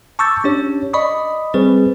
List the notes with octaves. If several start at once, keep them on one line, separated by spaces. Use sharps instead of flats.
A5 C#6 D6 E6 G6 A6
C#4 D4 G4 C#5
D5 D#5 B5 C#6 D#6
G3 C4 G#4 B4 C5